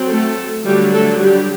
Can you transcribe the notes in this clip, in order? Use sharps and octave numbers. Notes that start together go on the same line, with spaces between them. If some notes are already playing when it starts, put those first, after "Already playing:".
Already playing: F#3 C4
A3 A4
D3 F#3 G3 A3 D4 G4
A3 A4
G3 G4